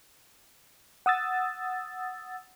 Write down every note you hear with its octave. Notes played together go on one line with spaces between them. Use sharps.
F#5 D#6 E6 A6